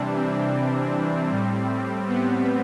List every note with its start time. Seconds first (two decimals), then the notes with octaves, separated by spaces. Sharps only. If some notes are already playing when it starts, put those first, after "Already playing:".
Already playing: C3 E3 G3 D4
0.15 C4
1.30 A2 G3
2.07 B3